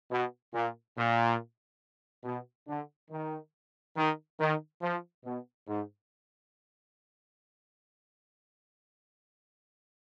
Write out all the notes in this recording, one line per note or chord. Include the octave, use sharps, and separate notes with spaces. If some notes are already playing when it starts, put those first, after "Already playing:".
B2
A#2
A#2
B2
D3
D#3
D#3
D#3
F3
B2
G#2